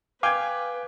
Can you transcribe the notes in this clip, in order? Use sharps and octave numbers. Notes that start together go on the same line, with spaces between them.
B4 F5 G5 G#5 D6 G6 G#6